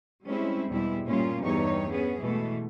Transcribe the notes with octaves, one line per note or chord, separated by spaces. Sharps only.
G3 G#3 C4 C#4 E4
E2 G2 B2 G3 G#3 E4
A#2 G3 A#3 C#4 F4
E2 G2 G3 D#4 C#5
B3 C#4 G#4
B2 E3 G#3 A3